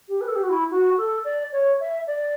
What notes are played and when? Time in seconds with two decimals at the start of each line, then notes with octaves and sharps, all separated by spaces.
0.08 G4
0.21 B4
0.28 A4
0.35 G4
0.42 F#4
0.49 E4
0.70 F#4
0.97 A4
1.24 D5
1.52 C#5
1.79 E5
2.06 D5